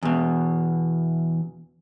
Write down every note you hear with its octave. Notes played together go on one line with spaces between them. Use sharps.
E2 B2